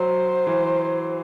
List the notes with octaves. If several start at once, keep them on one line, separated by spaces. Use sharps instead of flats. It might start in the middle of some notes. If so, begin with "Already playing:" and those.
Already playing: F#3 C5
E3